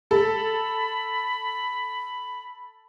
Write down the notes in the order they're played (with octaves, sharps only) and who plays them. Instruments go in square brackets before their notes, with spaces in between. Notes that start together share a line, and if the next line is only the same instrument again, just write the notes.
[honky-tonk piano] A4 [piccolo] B5